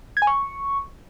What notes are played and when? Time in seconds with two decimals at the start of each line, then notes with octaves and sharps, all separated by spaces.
0.17 G#6
0.22 G#5
0.27 C#6